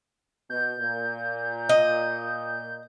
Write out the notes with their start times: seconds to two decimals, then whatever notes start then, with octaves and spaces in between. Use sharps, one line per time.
0.50 B2 G6
0.80 A#2
1.69 D#5